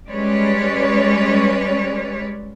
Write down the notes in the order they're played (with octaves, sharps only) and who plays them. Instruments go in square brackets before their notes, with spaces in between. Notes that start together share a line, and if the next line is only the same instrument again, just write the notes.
[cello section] G3 G#3 C#4 B4 C#5 D5